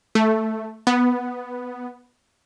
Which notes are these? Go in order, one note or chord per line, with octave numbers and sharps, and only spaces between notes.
A3
B3